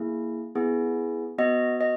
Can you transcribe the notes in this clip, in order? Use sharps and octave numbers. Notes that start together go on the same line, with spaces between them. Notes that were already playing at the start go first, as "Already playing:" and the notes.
Already playing: A#3 E4 G#4
B3 E4 G#4
B3 F#4 D#5
D#5